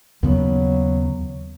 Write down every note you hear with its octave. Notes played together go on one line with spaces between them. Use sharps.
D#2 C#3 F#3 B3